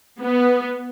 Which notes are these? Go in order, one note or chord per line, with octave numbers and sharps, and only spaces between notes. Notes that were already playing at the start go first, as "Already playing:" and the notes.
B3